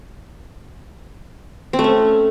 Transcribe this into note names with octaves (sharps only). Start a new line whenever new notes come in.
C4
A3
C#4